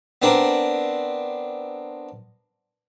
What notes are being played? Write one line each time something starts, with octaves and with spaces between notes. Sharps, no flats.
B3 C4 D4 A#4